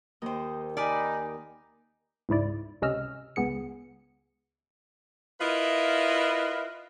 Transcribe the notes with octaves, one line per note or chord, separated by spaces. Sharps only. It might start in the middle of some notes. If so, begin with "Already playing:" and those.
D#2 C5 D#5 G5
D#4 D5 G#5 B5 F6
C#2 G#2 E4 D5
C#2 C3 C#4 D#5 E6 F6
C#2 B3 G#4 C#7
E4 F4 A#4 B4 D#5 E5